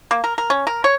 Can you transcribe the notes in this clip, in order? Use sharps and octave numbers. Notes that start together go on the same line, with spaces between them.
A#3
A#4
A#4
C#4
A#4
C#5